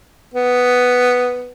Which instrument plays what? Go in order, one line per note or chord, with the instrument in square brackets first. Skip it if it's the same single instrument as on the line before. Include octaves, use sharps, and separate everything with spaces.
[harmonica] B3